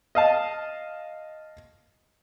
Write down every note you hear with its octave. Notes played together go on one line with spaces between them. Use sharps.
D#5 F5 A5